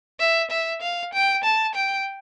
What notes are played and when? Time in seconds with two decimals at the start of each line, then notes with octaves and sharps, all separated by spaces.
0.20 E5
0.51 E5
0.82 F5
1.13 G5
1.44 A5
1.75 G5